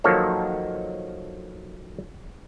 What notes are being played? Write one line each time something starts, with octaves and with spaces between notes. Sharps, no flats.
D#3 F3 F#3 A#3 A4 C#5